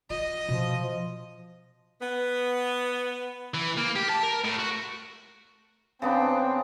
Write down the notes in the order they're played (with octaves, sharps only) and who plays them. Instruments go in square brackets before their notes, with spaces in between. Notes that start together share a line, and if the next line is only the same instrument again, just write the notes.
[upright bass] F4 [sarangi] D#5
[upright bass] B2 [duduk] F3
[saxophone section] B3
[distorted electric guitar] E3
A#3
G4
A5
A#4
A2
F#4
[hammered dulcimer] C#3 B3 D4 [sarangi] C4